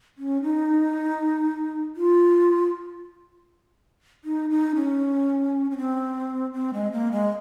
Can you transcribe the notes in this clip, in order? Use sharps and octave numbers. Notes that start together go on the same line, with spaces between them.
C#4
D#4
F4
D#4
D#4
C#4
C#4
C4
C4
G#3
A#3
G#3